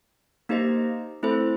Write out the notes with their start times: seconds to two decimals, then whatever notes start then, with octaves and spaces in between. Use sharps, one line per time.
0.49 A#3 D#4 G4 C5 D#5
1.23 A3 C4 E4 A4 C5